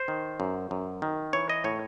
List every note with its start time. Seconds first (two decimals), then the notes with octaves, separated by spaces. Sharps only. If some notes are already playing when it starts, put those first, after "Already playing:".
Already playing: C5
0.08 D#3
0.40 F#2
0.71 F#2
1.02 D#3
1.33 E3 C#5
1.50 D#5
1.64 A2 C#5